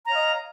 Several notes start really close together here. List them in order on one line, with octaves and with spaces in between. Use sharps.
A#5 C#5 F5 D#5